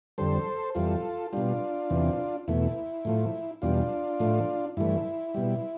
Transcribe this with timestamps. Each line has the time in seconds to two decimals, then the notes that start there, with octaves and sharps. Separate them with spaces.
0.18 F2 D3 G3 A4 C5
0.75 F2 E3 G3 F4 A4
1.33 B2 G3 D4 F4
1.90 E2 C3 E3
2.48 E2 B2 A3 E4
3.05 A2 F3 A3
3.62 E2 B2 G3 D4 F4
4.20 A2 F3 A3
4.77 G2 E3 A3 E4
5.34 B2 G3